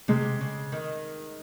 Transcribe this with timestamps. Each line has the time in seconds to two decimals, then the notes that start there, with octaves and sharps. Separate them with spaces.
0.08 C3 G#3
0.41 C#3
0.72 D#3